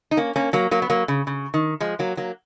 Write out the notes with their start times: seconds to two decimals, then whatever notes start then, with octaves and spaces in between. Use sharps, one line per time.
0.11 D#4
0.17 A#3 C#4
0.36 A#3 C#4
0.53 F#3 A#3
0.71 F#3 A#3
0.82 B3
0.90 F#3 A#3
1.08 C#3
1.27 C#3
1.54 D#3
1.80 F3 G#3
1.99 F#3 A#3
2.17 F#3 A#3